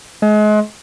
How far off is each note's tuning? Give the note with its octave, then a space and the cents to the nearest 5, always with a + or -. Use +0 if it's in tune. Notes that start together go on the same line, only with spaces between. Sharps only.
G#3 +35